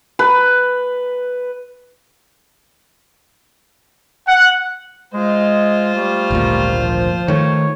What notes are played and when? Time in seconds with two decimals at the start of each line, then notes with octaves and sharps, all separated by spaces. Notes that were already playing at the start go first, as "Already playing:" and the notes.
0.19 B4
4.27 F#5
5.14 G#3 F4 C5 D#5
5.96 G3 A3
6.31 G#1 D2 A#2
6.77 F3
7.28 D#3 A3 C#5